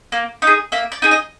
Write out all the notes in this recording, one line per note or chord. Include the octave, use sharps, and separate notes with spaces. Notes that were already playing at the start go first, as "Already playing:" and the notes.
A#3
D#4 G#4
A#3 E5
D5
D#4 G#4
D#5